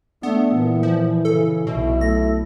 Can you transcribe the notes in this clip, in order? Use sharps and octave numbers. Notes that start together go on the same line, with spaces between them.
A3 B3 D4
A#2 E3
F3
C#3 A4
B1 B2 E4
A3 A#6